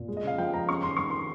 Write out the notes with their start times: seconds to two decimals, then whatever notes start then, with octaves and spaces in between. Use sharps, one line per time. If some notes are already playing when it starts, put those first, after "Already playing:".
Already playing: A#2
0.08 G#3
0.17 D#5
0.24 C#3 F5
0.38 F3 G5
0.53 G#3 A#5
0.69 C#4 C#6
0.83 D#3 C6
0.97 D#3 C#6
1.10 D#3 C6